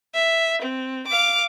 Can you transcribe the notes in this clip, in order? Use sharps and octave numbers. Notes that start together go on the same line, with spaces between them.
E5
C4
F5 D6